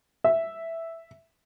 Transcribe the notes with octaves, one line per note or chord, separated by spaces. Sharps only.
E5